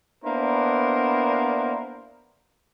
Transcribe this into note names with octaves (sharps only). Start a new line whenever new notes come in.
A#3 B3 D4 E4 A#4 C5